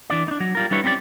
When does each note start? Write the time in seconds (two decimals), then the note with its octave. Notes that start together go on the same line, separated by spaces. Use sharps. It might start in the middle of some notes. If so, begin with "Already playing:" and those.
0.10 E3 D4 D5
0.28 D4 D#4
0.40 F#3
0.55 G3 F4 A#4
0.71 G3 D4 E4 B4 C#5
0.84 C4 C#4 G4 B4 D5